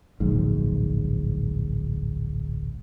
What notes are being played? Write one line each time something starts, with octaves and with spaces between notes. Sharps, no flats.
D1 A#1 G#2